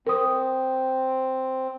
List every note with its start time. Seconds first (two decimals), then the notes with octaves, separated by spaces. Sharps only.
0.07 C4 A#4 D#6